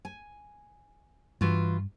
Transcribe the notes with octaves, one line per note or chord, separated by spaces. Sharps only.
G#5
G2 E3 F4 F#4